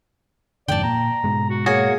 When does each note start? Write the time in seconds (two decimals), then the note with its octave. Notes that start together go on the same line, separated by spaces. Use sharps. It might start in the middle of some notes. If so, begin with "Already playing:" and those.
0.68 F2 G#2 D3 D5 G5 A5
0.83 A#2 A#5
1.24 G#2 B2 G#3
1.50 F#4
1.66 A#3 F#4 G#4 C#5